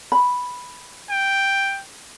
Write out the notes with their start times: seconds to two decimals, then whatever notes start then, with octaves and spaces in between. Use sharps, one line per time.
0.12 B5
1.10 G5